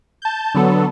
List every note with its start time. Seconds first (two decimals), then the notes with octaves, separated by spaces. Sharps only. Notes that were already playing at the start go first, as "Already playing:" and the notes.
0.22 A5 G6
0.54 D3 F#3 B3 A4